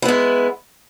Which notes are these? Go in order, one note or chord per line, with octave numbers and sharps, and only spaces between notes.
G#3 B3 E4